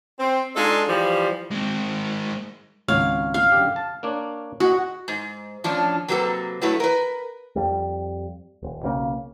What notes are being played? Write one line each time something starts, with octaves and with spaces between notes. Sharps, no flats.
C4
G#3 D4 D#4 F4 G#4 A4
E3 F3 G3
G#3 C4
G#1 C#2 C#5 F5
F5
F#2 D3 G4
A5
A#3 D4 C#5
F#4 G#4 D#5
G#2
A2 F3 C#4 D4
C3 F#3 A#3 G4 A4 B4
G2 F#3 A3 E4 B4
A#4 B4
F2 G3
D#1
B1 C#3 A#3